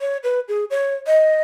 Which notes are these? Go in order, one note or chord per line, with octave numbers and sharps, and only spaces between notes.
C#5
B4
G#4
C#5
D#5